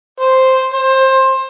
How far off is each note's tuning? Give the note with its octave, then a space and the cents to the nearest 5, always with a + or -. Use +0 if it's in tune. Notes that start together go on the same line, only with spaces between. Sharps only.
C5 +0
C5 +20